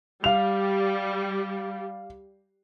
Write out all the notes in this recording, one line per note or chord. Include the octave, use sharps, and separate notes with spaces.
G3 F5 F7